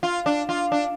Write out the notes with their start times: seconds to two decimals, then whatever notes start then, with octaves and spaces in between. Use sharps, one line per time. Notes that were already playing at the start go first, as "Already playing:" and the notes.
0.03 F4
0.26 D4
0.49 F4
0.72 D4